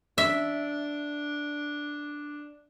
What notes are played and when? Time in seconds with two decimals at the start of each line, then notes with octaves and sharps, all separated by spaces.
0.18 D4 E5